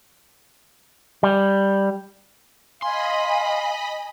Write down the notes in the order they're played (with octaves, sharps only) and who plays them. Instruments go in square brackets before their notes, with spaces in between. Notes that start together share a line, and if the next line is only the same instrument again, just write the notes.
[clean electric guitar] G3
[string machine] D#5 B5 [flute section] F5 [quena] G#5 [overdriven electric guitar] C6